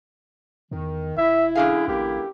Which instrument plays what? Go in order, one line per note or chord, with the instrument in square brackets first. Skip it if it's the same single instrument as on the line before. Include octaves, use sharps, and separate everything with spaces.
[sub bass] E2 [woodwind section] D#3
[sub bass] E1 [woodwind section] E4 [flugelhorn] E5
[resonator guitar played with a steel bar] F#2 D3 F5 [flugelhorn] G#4
[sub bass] A1 [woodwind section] A#3 E4 [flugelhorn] G4